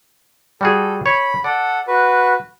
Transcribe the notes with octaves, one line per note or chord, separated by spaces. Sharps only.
G3 F#4 G#4 A4
C#5 B5
A4 D5 F#5
F#4 B4